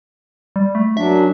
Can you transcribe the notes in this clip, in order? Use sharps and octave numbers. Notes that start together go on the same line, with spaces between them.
G3
A3
F#2 F#3 D4 E5